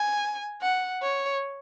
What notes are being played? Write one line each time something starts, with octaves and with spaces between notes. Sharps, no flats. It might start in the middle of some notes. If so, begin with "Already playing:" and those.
Already playing: G#5
F#5
C#5